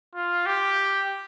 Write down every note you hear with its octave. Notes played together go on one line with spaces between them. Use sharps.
F4
G4